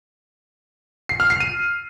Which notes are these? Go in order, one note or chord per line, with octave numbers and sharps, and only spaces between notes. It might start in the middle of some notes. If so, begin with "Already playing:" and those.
C7
F6
C7
D#7